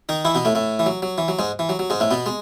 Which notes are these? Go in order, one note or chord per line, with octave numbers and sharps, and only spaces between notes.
D#3 D#4
E3 E4
B2 B3
A2 A3
A2 A3
E3
F#3
F#3
E3
F#3
G#2 G#3
E3
F#3
F#3
G#2 G#3
A2 A3
B2 B3
G#3